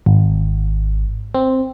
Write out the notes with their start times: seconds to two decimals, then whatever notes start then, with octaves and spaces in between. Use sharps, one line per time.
0.06 G#1
1.35 C4